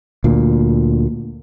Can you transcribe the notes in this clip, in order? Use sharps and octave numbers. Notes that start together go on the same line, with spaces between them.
D2 A#2